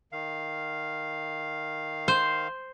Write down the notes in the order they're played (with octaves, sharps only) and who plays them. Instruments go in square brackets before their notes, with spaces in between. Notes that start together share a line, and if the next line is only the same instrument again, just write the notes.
[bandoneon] D#3 F5
[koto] C5